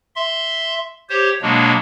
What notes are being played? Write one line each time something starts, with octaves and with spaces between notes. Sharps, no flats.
E5 C6
G4 C5 C#5
B2 F#3 G#3 A#3 D4